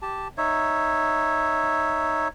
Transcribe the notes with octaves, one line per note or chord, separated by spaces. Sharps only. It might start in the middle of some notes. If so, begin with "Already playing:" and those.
G4 A5
D#4 C#5 E5